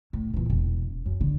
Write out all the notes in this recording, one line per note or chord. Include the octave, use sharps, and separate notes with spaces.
A2
A#2 E3
E1
F#2
D3